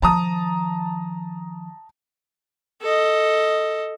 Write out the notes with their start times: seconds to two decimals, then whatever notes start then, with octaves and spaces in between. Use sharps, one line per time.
0.02 D#3 F3 A5 A#5 D#6
2.82 A4 D#5